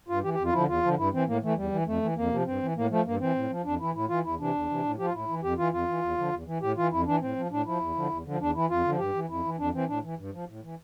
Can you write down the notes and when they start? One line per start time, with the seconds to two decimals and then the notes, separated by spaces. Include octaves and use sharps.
0.09 G2 F4
0.23 E3 G4
0.34 G4
0.38 F2
0.44 F4
0.53 D3 F3 E4
0.67 E2 F4
0.83 D3 F3
0.98 G2 E4
1.13 E3 C4
1.27 A2 A#3
1.43 E3 A3
1.57 E2 G3
1.72 E3
1.86 F2 A3
2.02 E3
2.16 F2 A#3
2.31 C3 F3
2.46 G2 C4
2.62 E3
2.76 A2 A#3
2.90 F3 A3
3.05 G2 A#3
3.20 E3 C4
3.35 A2
3.50 F3
3.64 F2 D4
3.80 E3 E4
3.94 A2 E4
4.09 E3 F4
4.24 E2 E4
4.40 C3 E3 D4
4.55 E2
4.69 C3 E3
4.84 A2
4.98 F3 G4
5.05 F4
5.13 A2 E4
5.29 E3
5.43 F2 G4
5.58 E3 F4
5.72 F2 F4
5.88 E3
6.02 E2
6.18 D3 F3
6.32 E2
6.46 E3
6.61 A2 G4
6.77 E3 F4
6.91 F2 E4
7.06 E3 D4
7.21 A2 C4
7.36 F3
7.51 A2 D4
7.66 F3 E4
7.80 E2
7.95 D3 F3
8.10 E2
8.25 D3 F3
8.40 E2 D4
8.55 E3 E4
8.70 F2 F4
8.84 D3
8.89 F3
8.99 G2 G4
9.14 E3
9.29 F2 E4
9.45 E3
9.59 F2 D4
9.74 E3 C4
9.88 A2 D4
10.03 E3
10.19 G2
10.33 F3
10.48 A2
10.63 E3